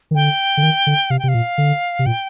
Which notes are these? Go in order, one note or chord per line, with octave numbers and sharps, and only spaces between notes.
D#3
D3 G5
D3
D#3
D3
C3 F5
G5
C3 F5
A#2
D3
C3
A#2 G5